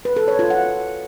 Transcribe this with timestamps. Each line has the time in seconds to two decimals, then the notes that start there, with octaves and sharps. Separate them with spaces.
0.05 B4
0.16 A4
0.28 C#5
0.39 F4
0.50 F#5